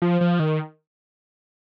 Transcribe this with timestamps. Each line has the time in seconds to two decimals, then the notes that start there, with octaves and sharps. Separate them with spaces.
0.02 F3
0.21 F3
0.40 D#3